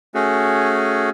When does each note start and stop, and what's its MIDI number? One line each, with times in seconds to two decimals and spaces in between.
0.15 1.10 57
0.15 1.10 61
0.15 1.10 66
0.15 1.10 68